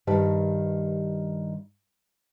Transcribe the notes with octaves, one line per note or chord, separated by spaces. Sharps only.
G2 D#3 G4 B4 A5